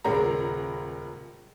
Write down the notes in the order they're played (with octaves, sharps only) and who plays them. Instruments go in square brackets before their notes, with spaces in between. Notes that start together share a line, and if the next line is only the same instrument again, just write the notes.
[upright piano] D#1 C#2 G#3 A#4 A#5